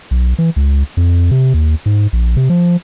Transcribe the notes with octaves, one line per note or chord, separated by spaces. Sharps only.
B1
E3
C#2
F2
C3
D#2
G#2
A#1
C3
F3